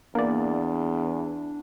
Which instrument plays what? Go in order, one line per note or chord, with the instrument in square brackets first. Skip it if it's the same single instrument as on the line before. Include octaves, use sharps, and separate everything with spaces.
[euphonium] E2 [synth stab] A#3 D5 [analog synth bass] D4